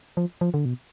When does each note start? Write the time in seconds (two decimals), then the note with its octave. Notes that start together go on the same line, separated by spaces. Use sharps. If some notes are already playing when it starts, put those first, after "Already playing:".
0.17 F3
0.41 F3
0.54 D3
0.65 B2